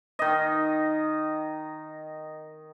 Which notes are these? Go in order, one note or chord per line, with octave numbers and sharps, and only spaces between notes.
D#3 D#5